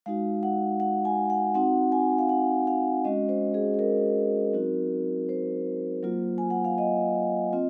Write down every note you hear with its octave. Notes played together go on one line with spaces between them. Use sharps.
G#3 D#4 F#4 F5
F#5
F#5
G#5
F#5
C4 D#4 F#4 F#5
G#5
F5
F#5
F5
G#3 C#4 F#4 D#5
C5
G#4
G#4
A#4
F#3 C4 D#4 F#4
C5
F#3 A#3 F4
G#5
F#5
F5
D#5
C4 F4